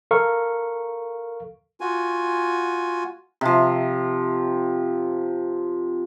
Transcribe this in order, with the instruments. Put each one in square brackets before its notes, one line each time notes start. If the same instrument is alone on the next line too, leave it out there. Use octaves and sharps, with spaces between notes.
[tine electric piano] A4 A#4 F5 C#6
[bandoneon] F4 F#4 G#5
[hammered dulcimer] C3 F3